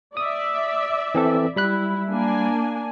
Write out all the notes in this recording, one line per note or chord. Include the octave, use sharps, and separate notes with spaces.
D5 E5 D#6
E3 C4 A4
G3 E4 B5 F#6
A#3 D4 G#5